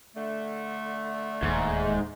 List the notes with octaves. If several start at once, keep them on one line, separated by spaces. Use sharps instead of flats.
D3 A3
D1 D#2 G#2